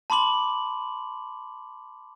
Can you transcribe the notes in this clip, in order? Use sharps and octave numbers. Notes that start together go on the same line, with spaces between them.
A5 B5 C6 D6 F#7